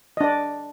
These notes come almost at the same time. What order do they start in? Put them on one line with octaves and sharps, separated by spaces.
D#5 D4 D5